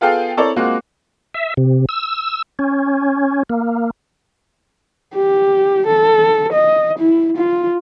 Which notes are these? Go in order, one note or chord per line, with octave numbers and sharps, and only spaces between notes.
B3 F4 G#4 A4 F5 G5
C4 E4 A4 A#4 C#5 D5
G#3 A#3 C4 F4 F#4
E5
C3
E6
C#4
A#3
G4
A4
D#5
E4
F4